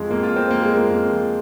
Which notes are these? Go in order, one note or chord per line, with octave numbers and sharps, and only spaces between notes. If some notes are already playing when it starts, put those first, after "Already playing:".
Already playing: F2 F3 G#3
F2 A#3
F4
F3
C4
F2 A#3
G#3
F3
A#3
F2
F3